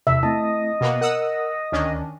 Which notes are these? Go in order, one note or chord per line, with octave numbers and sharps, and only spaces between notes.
E2 C3 E5
A3 C4 E4 D#5 A5
B2 A#3 B3
A#4 F#5 D#6 E6
D2 D#3 C#4 D4